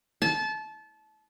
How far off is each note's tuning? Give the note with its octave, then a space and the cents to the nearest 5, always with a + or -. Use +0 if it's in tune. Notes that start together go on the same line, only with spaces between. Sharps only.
A5 -25